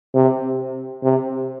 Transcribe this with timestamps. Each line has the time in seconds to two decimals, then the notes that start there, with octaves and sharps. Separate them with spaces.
0.14 C3
1.03 C3